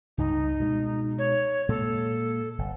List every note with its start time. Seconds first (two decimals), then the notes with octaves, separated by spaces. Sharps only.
0.18 C#2 G2 D#4
0.60 B2 G#3
1.19 C#5
1.69 A#2 G#3 A4
2.58 G1